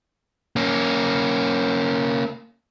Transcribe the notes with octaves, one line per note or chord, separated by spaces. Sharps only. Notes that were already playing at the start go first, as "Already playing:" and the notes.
A#3 C#4